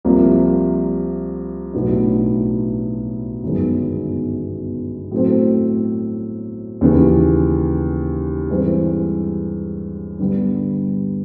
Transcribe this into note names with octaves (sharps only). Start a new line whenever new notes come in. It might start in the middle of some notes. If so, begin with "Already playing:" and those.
C2 C3 F3 A#3
B1 A2 F#3 B3 D4
G1 F#2 D#3 G#3 B3
A2 F#3 A3 C4
D#2 C#3 E3
G2 E3 G#3 C4
G2 D3 G3 B3